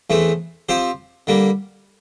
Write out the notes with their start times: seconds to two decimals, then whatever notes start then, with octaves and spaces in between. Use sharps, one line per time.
0.10 E2 E3 A3 C4
0.69 F3 C4 G4 C5
1.27 D3 G3 A#3